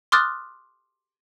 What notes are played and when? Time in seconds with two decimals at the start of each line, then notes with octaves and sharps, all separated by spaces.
0.12 C6 D6 D#6 F6 F#6 A6